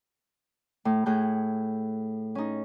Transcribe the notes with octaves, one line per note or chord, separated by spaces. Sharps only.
A2
A2 G#4 F#6 G6
C#4 D#4